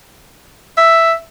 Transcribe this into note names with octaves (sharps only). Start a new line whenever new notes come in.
E5